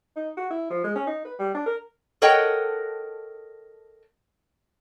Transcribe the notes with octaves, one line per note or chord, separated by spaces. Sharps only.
D#4
F#4
E4
F3
G#3
C#4
D#4
B4
G3
D4
A#4
A4 A#4 C#5 D#5 F#5 G5